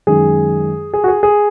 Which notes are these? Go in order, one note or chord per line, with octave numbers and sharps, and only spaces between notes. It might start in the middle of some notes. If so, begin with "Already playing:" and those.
F#2 D#3 G#3 G#4
G#4
F#4
G#4
G#4